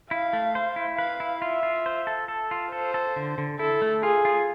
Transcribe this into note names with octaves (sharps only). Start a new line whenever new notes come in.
E4 F5
A3
C5
E4
B4 F5
E4
F4 E5
F4
C5
A4
A4
F4
A4 C5
A4
D3
D3
E4 A4
A3
F4 G#4
F4